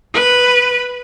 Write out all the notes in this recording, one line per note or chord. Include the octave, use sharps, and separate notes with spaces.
B4